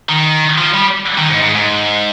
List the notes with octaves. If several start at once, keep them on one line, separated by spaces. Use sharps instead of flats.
D#3
F3
G3
D#3
G#2
G#2
G#2